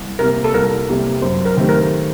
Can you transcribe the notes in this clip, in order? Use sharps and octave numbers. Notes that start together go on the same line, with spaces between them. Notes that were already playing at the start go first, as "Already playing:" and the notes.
Already playing: C2
C3 G3 A#3 A#4
A4
C2 A#4
C3 G3 A#3
F#2 C5
A#4
D#3 A3 C4 G4
A#4